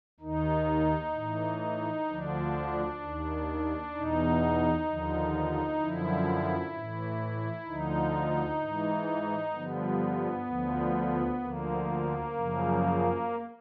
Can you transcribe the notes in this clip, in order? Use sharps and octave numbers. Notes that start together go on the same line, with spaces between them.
D#2 D#3 D#4
A2 E3
D2 D3 F3 D4
D#2 D#3
E2 B2 D#4
D#2 D3 F3
F#2 D3 F3 E4
A2 E3
D2 D3 F3 D#4
G#2 E3
G2 D3 F3 B3
D2 D3 F3
D2 D3 F3 A#3
F#2 C#3 F3